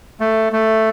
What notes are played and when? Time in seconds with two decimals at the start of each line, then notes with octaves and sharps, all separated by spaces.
0.20 A3
0.53 A3